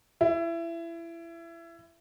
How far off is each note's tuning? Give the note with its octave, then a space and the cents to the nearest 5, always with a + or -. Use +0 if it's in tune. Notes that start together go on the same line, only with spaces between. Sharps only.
E4 +25